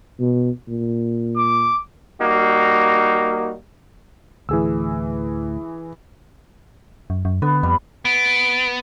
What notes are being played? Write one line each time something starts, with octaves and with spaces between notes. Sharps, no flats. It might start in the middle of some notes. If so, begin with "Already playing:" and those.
B2
A#2
D6
G3 A#3 D#4 F#4
D2 A2 E3 G#4 E6
F#2
F#2
D3 B3
F2 G3
B3 D7